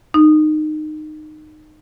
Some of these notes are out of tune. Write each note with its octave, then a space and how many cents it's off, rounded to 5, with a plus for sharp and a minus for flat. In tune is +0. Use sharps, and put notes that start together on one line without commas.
D#4 -20